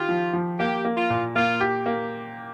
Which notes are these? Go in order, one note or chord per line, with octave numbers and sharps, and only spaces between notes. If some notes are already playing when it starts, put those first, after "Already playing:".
Already playing: D#3 F4 G4
F3
F3
A#3 G4
A#3
F4
A#2
A#3 F4
G4
A#3